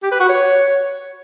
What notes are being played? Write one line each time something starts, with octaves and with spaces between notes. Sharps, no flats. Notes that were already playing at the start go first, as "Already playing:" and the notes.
G4
B4
F#4
C#5